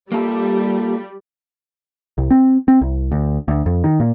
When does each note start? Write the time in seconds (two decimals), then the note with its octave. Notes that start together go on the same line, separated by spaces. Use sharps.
0.12 G3 A#3 F4 A4
2.18 C2
2.31 C4
2.68 C4
2.81 C2
3.12 D2
3.48 D2
3.66 F2
3.84 D#3
4.00 A#2